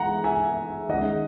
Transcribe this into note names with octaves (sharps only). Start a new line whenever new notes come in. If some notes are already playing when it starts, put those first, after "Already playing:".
Already playing: E3 G#3 D#4 F#5 A#5
E5 G#5
D#3 G#3 C#4 D#5 F#5